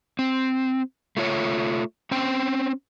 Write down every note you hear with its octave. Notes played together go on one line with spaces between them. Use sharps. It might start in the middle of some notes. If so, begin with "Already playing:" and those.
C4
A3 F4 C#5
C4 C#4 C5 G5